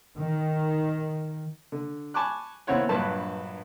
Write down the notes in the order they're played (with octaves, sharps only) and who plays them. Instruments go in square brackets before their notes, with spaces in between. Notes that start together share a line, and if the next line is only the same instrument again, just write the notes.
[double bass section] D#3
[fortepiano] D3
G#5 A5 B5 C#6 D6 F#6
D#2 B3 C4 E4 C#5 F#5
A#1 G2 F#3 B4 A5